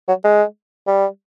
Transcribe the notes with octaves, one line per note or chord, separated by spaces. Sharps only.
F#3
G#3
G3